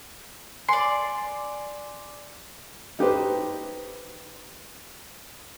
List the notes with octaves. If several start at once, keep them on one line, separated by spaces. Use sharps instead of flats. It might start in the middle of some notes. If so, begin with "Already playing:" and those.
D5 G#5 C6
D#4 G4 B4 C5